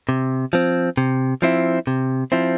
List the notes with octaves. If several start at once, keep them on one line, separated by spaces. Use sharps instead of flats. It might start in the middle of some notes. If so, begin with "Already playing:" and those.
C3
F3 C4
C3
F3 C4 E4
C3
F3 C4 E4